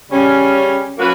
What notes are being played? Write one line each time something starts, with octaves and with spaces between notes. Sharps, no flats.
C#3 G3 C#4
F#3 A#3 C#4 F#4 B4